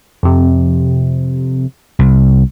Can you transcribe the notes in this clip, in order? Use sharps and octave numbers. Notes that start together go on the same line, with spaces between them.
F2 C3
C2